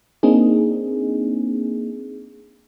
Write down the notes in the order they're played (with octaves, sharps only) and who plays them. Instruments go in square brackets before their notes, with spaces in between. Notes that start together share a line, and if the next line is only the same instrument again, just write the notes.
[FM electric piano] A#3 C4 D4 D#4 G#4